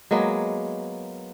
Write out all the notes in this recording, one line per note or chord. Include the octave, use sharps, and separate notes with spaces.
F#3 G#3 A#3 B3